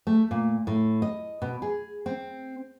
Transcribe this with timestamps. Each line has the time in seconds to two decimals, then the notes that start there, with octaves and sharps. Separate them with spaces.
0.07 A3
0.31 A#2
0.67 A2
1.02 D#5
1.42 B2
1.62 G#4
2.06 C4